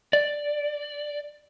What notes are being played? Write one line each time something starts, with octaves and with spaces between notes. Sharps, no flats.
D5